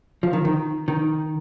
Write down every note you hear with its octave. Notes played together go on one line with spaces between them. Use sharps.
F3
D#3
D#3
D#3